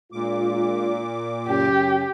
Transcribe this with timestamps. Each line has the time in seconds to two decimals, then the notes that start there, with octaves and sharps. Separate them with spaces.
0.13 A#2 G#3 D4 F4 D6
1.49 F#2 C#3 C#4 G4